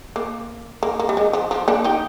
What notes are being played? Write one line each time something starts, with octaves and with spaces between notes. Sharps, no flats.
A#3
A#3
A#3
G3
G#3
F3
F3
A#3 D4
D#4 G4